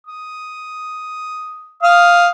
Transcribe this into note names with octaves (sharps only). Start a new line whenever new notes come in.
D#6
F5 D#6